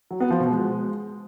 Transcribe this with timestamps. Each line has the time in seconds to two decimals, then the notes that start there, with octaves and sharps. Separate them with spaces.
0.11 F#3
0.20 B3
0.30 F3
0.40 B2
0.50 G#3